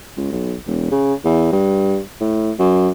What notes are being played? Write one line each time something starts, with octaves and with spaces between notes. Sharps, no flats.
C#2
B1
E1
C#3
E2
G2
A2
F#2